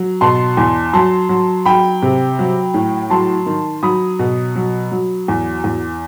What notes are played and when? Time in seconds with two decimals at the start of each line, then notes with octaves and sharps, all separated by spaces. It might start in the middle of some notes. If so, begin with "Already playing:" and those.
Already playing: F#3
0.21 B2 A5 C6
0.57 E2
0.93 F#3 A5 C6
1.29 F#3
1.66 F#3 G5 B5
2.02 C3
2.39 F#3
2.74 A2
3.10 F#3 A5 C6
3.46 D#3
3.83 F#3 B5 D#6
4.19 B2
4.55 F#3
4.91 F#3
5.28 E2
5.64 E2